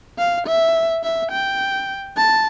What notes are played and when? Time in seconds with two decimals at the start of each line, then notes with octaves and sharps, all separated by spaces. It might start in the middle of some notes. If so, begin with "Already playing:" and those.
0.18 F5
0.47 E5
1.04 E5
1.32 G5
2.18 A5